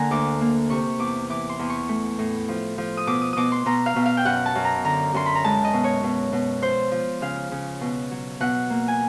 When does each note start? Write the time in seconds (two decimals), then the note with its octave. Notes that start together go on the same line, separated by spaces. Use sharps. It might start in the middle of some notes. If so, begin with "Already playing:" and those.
Already playing: D3 A#3 F#5 G#5 A#5
0.11 D2 D6
0.41 A#3
0.70 C3 C#6
0.99 E2 D6
1.30 E3 D6
1.49 C6
1.59 E2
1.70 C#6
1.89 A3
2.19 A2
2.49 F3
2.78 F3
2.97 D#6
3.07 B2 D6
3.22 D#6
3.33 B2 D6 D#6
3.52 C6
3.66 B2 A#5
3.86 F5
3.96 B2
4.06 F5
4.17 G5
4.25 F#2 F#5
4.46 A5
4.55 F#2
4.65 A#5
4.85 D3 A#5
5.14 F#2 C6
5.26 B5
5.35 A#5
5.44 G#3 A5
5.65 D#5
5.73 B2
5.84 C#5
6.03 B2
6.33 B2
6.62 F3 C5
6.92 F3
7.22 C#3 F5
7.52 C#3
7.81 B2
8.11 F#3
8.40 B2 F#5
8.70 A#3
8.88 G#5